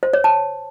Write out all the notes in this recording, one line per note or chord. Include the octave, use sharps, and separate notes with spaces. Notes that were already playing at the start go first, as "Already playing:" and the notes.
C5
C#5
A5